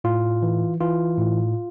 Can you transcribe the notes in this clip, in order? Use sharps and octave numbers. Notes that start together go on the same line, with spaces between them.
A2 F4
E3
E3 F4
A2